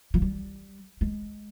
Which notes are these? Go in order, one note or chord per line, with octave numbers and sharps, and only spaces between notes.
F3
G3
G#3